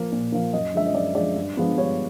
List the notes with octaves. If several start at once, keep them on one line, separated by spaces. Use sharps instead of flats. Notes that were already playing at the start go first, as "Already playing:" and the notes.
Already playing: F3 A#3
A#2
F3 A#3
F#2 D#5
D3 F3 G#3 E5
D#5
F#2 D5
D3 F3 G#3 D5
G2
D3 F3 G#3 B3
G2 C#5